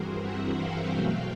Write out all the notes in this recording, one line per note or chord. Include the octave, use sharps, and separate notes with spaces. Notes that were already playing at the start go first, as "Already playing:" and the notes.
Already playing: G2 E3 G3 C4 F#4 G#4 A#4 C5
E5 F#5
F5 G5
B2 F#3 A3 F5 G5